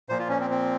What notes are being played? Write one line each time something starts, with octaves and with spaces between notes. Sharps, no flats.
A#2 F3 C5
F4
C#4
C4
C4